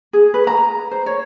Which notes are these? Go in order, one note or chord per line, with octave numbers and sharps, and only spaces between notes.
G#4
B4
A#5
C5
C#5